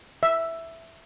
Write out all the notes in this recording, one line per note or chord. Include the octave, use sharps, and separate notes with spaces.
E5